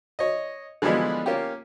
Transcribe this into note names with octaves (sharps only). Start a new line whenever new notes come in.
C#5 D#5
D3 E3 F3 G3 G#3 B3
A#3 C#4 F4 G4